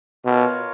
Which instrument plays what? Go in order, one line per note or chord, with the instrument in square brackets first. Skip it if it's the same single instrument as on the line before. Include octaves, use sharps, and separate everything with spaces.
[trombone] B2 [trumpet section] F4 A#4 C#5